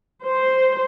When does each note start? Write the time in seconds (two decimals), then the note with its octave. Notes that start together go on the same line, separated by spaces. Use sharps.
0.24 C5